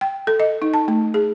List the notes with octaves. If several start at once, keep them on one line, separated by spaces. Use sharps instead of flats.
G5
A4
D#5
D#4
A5
A3
G#4